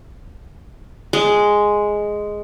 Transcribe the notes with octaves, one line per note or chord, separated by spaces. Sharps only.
G#3